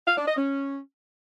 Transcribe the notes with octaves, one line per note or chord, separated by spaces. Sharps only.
F5
D4
D#5
C#4